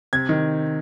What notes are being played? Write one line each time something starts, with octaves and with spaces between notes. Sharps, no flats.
C3 G#6
D#3